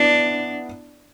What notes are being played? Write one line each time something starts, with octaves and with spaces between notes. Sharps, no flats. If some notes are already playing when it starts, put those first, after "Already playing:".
Already playing: B3 D4 E4